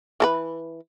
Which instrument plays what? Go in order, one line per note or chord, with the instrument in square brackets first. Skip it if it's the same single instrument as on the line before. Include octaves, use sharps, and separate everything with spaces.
[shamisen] E3 A4 B4